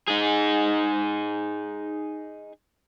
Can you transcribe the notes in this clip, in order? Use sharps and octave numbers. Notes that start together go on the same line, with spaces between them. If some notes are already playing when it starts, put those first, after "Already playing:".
D#4 G#4